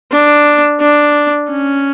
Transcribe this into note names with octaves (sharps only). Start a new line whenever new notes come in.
D4
D4
C#4